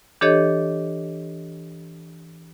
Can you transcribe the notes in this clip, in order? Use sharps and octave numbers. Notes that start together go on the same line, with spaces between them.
E3 D4 G4 A4 C#5 D#5